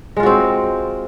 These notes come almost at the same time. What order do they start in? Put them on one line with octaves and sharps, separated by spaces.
G#3 F4 F#4 C4